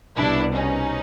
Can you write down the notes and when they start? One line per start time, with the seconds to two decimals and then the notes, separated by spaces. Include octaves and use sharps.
0.17 C2 B2 D4 E4
0.54 C#4 D#4